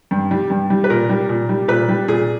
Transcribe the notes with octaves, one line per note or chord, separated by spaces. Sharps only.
G2
G3
G2
G3
B4
A#2 A#4
G3
A#2
G3
A#2 B4
G3
A#2 G#4